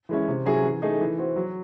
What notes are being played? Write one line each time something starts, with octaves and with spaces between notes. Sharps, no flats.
E3 G#3 C#4 E4
C3
F#3 C#4 E4 G#4
E3
A3 D#4 G#4
E3
C4 F#4
F#3